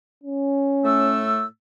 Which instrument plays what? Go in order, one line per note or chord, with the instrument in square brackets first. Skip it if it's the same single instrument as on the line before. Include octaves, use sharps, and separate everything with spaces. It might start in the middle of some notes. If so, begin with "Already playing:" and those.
[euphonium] C#4
[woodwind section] A2 A3 E6